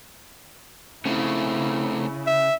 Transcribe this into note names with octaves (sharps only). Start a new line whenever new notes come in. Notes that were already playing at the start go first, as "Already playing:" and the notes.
C#3 A3 C4 E4
E5